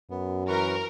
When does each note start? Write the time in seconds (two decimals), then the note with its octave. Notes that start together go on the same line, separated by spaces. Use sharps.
0.10 F#2 B3
0.48 E3 A#4 B4 C#6